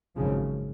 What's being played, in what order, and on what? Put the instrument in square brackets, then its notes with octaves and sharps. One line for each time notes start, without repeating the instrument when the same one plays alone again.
[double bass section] G#1 F#2 C#3 F3